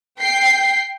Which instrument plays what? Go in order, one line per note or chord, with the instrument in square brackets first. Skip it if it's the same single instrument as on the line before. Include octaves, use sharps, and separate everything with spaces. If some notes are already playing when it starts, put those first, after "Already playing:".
[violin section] G5 C7